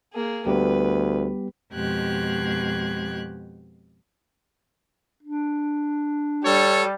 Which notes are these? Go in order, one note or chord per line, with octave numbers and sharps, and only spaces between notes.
A#3 G#4
D2 G3 B3 G4 B4
F2 B2 G#3 G4 F#6 G#6
D4
G3 A4 C#5